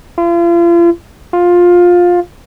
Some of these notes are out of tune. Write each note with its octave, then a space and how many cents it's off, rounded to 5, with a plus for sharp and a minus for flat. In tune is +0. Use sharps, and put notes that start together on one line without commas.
F4 -40
F4 +15